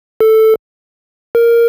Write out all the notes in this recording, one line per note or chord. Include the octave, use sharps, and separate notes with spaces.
A4
A#4